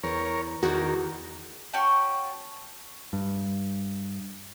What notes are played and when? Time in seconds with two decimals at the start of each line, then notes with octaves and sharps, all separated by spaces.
0.04 E2 A#4 C#5
0.63 E2 D#3 F#4 A#4
1.73 C#4 F#4 G5 A5
3.13 G2